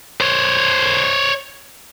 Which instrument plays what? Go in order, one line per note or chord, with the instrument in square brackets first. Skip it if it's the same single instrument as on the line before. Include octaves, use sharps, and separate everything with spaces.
[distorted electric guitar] C5 C#5